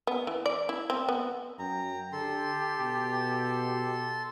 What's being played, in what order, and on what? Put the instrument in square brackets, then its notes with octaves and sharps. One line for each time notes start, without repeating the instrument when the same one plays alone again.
[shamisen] B3
E3
D5
E4
C4
B3
[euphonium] F#2 [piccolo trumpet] G5 [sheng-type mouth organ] A#5
[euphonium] D3 [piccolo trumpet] G4 [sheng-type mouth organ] A4 C6
[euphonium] B2